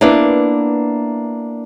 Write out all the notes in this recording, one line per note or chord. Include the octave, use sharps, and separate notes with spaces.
A#3 B3 D4 E4 B4